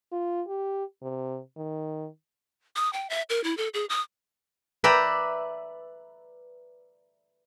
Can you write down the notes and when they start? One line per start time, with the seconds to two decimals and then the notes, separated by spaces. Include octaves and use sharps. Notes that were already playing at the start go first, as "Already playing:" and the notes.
0.12 F4
0.48 G4
1.02 C3
1.56 D#3
2.76 D#6
2.93 G5
3.10 E5
3.30 A#4
3.44 E4
3.57 A4
3.74 G#4
3.90 D#6
4.84 B4 D5 E5 G5 A#5